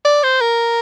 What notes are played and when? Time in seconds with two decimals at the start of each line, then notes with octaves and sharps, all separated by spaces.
0.05 D5
0.24 C5
0.41 A#4